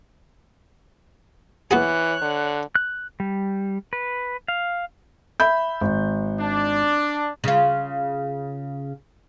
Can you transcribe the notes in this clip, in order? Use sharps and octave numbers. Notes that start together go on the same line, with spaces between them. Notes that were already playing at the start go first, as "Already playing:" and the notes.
E3 B3 F#4 G#4 C#5 F#6
D3
F#6
G3
B4
F5
E5 B5 G6
G#1
D4
C#3 F4